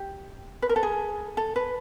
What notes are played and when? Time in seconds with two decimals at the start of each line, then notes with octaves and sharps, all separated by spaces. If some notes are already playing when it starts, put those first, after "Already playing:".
Already playing: G4
0.62 B4
0.69 A#4
0.76 A4
0.83 G#4
1.37 A4
1.56 B4